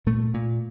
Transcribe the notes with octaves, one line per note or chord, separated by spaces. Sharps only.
A#2 A3
A#2